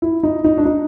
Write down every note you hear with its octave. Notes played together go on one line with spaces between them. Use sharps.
E4
D#4
D#4
D4
D#4